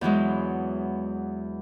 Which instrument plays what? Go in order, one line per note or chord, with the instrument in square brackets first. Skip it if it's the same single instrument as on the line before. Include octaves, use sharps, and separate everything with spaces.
[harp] E2 E3 F#3 G#3